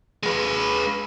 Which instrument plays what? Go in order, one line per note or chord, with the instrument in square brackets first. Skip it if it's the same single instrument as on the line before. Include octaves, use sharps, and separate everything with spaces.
[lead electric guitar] G#3 B4